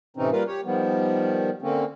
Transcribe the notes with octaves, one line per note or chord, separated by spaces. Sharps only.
A2 C3 E3 C4 C#4 D#4
G3 A#3 F4 A#4 B4 F5
G4 C#5
D#3 F3 G3 B3
D3 A#3 C4 C#4